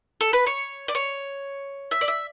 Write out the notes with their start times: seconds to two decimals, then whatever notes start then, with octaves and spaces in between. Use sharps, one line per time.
0.21 A4
0.33 B4
0.47 C#5
0.88 D5
0.95 C#5
1.91 E5
2.01 D5
2.08 E5